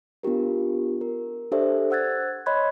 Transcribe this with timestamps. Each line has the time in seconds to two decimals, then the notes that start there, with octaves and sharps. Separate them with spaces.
0.23 B3 D4 F4 G4 A#4
1.01 A#4
1.52 D4 G4 A4 C5 D5 E5
1.90 C5 F#5 E6 F#6 G#6 A6
2.46 C#5 D#5 B5 C6 F#6 G#6